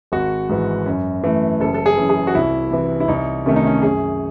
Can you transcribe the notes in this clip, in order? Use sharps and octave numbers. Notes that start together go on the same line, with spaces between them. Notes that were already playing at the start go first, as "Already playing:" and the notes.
G#1 F#4
G#2 E3
F#2
E3 A3
F#1 A4
A4
G#4
F#2 E3
G#4
F#4
C2 E4
C3 E3
E4
C2 D#4
C3 D#3 A3 C#4
D#4
C#4
F#2 G#4